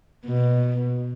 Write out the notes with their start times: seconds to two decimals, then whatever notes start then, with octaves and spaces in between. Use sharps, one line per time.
0.26 B2